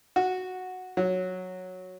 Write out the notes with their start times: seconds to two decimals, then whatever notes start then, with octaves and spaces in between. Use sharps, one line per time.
0.16 F#4
0.97 F#3